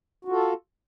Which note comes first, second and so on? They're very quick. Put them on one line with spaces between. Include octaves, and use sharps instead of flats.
F#4 F4 A4